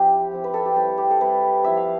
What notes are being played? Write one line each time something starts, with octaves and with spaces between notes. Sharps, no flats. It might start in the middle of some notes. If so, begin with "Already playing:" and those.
Already playing: F3 C4 E4 G4
F3 C4 E4
B4
A4
G4
G3 C4 E4 A4
G4
A4
G3 C4 E4 B4
F3 B3 E4 E5
F5